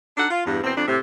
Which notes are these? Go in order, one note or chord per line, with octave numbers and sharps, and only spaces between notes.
D4 D#4 A4 F#5
F4
E2 G2
E2 B2 C4
F2 D4
A2 C3